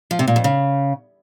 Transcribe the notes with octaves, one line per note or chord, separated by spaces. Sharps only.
F3
C3
A#2
F2
C#3